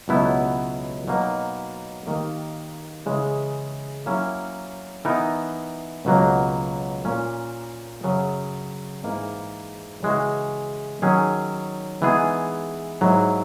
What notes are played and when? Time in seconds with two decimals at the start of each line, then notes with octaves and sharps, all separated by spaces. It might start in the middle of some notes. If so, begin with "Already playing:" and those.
0.08 C#2 B2 F#3 B3 E4
1.08 B2 F#3 A#3 D#4
2.07 D#2 D#3 A#3
3.06 C#3 E3 G#3
4.06 F#3 A#3 C#4 E4
5.05 E3 B3 D#4 A#4
6.05 C#2 B2 F#3 A#3
7.05 A#2 A#3 C#4
8.03 F#2 C#3 F#3 C#4 G#4
9.04 G#2 E3 A#3
10.02 C#3 E3 G#3 C#4 F#4
11.02 D#3 F#3 C#4 G#4
12.02 E3 G#3 B3 D#4 G#4
13.01 G#2 F#3 A#3 E4